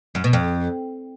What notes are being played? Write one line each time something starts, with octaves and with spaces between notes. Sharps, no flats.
F#2
B2
F2